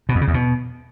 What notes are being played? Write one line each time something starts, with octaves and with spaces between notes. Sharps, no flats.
B2
F2
C#3
E2
B2